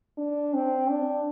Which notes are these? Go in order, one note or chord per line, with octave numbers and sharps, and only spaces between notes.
D4
C4
D4